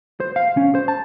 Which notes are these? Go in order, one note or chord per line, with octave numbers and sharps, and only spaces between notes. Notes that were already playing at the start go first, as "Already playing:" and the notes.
C5
F5
C#4
C5
A5